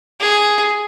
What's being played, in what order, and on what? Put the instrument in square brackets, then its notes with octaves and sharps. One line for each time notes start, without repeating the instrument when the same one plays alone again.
[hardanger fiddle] G#4